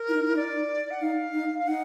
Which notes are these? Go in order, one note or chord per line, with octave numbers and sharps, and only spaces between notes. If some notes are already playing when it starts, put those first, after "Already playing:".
Already playing: A#4
E4
D#4
E4
D#4 D5
F#5
D#4 F5
D#4
F5
D#4 F#5